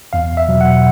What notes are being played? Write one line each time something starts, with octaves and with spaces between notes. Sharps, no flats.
E2 F5
E5
B2 F#3
F#5